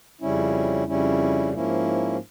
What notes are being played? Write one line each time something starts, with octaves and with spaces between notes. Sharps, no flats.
F2 C#3 G3 C#4 E4
F2 C#3 G3 C#4 E4
G#2 F3 A#3 C#4 E4